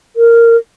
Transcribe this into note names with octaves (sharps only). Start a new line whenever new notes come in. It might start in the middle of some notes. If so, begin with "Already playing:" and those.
A#4